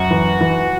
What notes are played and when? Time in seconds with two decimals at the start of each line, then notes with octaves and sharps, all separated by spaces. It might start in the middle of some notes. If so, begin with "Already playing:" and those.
Already playing: F#2 F#4
0.11 E3
0.41 E3